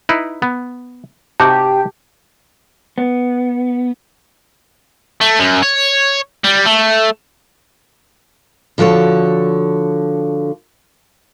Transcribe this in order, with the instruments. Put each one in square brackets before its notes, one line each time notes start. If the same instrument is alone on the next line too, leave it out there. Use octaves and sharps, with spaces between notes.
[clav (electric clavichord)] D#4 E4 B4
B3
[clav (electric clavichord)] C3 D#4 F#4 [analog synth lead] G4 [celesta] A5 G6
[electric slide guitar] B3
[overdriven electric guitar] A3
F#2
C#5
G3
A3
[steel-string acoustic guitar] D3 F3 F#4 A4 C#5